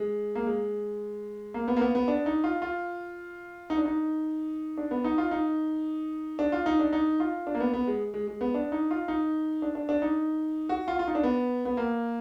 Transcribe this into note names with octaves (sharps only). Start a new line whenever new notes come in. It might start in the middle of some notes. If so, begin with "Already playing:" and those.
Already playing: G#3
A#3
G#3
A#3
B3
A#3
B3
B3
D4
D#4
F4
F4
D#4
D4
D#4
D4
B3
D#4
F4
D#4
D4
F4
D#4
D4
D#4
F4
D4
A#3
B3
B3
G#3
G#3
G#3
B3
D4
D#4
F4
D#4
D4
D4
D4
D#4
F#4
F4
F4
D#4
D4
B3
B3
A#3